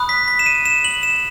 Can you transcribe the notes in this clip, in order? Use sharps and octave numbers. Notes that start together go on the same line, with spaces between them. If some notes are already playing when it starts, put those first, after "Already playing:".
Already playing: B5 D#6 F#6
B6
B6
E7
D#7
E7
F#7
E7